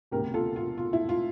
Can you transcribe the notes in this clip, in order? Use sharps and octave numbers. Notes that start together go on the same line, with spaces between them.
E1 D2 C3 G4 A#4
F4 A4
F4
F4
E4
F4